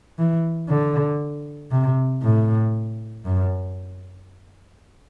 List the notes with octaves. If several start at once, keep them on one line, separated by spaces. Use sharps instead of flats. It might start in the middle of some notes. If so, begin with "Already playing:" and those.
E3
D3
C3
A2
F#2